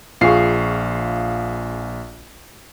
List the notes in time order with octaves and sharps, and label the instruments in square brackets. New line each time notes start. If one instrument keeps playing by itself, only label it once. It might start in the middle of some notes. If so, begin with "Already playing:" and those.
[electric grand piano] A#1 C7 [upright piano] F4 G#4 C#6